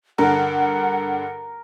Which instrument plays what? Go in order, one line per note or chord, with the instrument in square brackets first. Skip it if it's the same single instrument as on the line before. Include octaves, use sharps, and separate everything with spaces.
[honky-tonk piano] G2 D3 [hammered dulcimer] A#4 [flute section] F#5